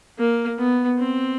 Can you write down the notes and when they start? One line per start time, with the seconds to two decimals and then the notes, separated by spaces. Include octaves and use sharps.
0.18 A#3
0.58 B3
0.98 C4